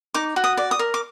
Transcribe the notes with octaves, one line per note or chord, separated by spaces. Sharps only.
D#4 D6
F#4
D#6
D5
D#6
A#4
D6